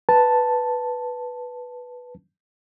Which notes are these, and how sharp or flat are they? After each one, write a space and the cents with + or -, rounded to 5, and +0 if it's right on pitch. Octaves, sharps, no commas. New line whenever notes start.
B4 +0 A5 +0